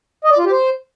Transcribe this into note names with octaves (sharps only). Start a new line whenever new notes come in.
D#5
D5
F4
G4
C5